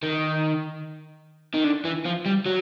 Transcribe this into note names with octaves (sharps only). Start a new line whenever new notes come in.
D#3
D#3
D3
E3
F3
G3
F#3